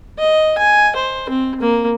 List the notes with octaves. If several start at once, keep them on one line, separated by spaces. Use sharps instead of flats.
D#5
G#5
C5
C4
A#3